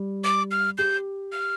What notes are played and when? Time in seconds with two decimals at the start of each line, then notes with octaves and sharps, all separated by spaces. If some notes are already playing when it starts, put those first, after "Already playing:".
Already playing: G3
0.24 D6
0.51 F6
0.78 G4 G6
1.32 F6